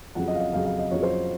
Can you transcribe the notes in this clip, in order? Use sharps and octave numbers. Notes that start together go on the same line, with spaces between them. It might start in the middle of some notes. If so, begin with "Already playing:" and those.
F2 C#3 F#3 F#5
D#5
F5
D#5
F2 C#3 F#3 F5
F5
D#5
F2 C#3 F#3 C#5
C5